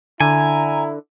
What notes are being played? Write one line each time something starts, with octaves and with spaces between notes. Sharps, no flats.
D3 E4 G#5 A#5